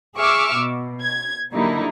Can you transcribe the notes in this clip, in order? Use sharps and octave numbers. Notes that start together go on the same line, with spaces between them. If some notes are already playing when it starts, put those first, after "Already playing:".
G#4 E5 C#6 D6 E6 F6
B2
G#6
D3 F#3 G3 A#3 D#4 E4